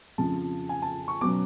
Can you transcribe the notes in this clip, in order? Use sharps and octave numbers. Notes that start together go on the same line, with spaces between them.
F2 C#3 F3 A5
G#5
A5
C#6
B2 F#3 C#4 D6